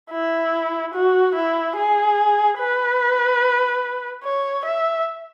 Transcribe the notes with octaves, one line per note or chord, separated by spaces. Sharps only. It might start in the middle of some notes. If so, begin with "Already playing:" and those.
E4
F#4
E4
G#4
B4
C#5
E5